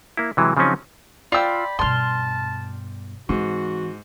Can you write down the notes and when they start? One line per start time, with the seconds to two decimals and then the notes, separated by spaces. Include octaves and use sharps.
0.17 A#3 E4
0.37 C3 E3 F#3 G#3
0.57 C#3 F3 F#3 C4 C#4 D#4
1.32 F4 D5 G5 B5 E6
1.79 G2 B2 A5 C6 F6
3.29 G#2 E3 C4 F#4